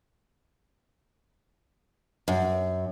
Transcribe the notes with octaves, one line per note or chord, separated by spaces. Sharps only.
F#2